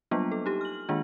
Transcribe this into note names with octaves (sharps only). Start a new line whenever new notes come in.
F#3 G3 A#3 B3 D4 F4
A4
D#4 G4
F6 F#7
D#3 G#3 A#3 D4 F4